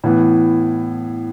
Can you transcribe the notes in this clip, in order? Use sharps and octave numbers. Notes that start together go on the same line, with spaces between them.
A2 E3 B3